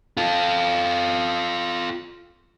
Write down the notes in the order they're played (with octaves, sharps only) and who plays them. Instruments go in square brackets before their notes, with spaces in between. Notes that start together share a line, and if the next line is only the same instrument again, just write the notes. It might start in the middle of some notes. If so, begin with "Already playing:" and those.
[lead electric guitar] F4 A4